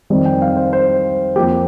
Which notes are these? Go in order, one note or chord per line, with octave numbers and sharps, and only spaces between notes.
F2 D#3 G3 C4
G5
F5
C5
C5
F2 F3 A#3 G4